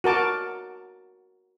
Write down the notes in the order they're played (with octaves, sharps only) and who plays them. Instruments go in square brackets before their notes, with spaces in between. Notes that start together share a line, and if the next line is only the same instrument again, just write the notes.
[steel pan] F#4 A#4 A5 D6